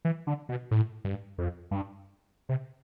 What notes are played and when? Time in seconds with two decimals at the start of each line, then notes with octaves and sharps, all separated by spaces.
0.05 E3
0.27 D3
0.49 B2
0.71 A2
1.05 G2
1.38 F2
1.71 G2
2.49 C3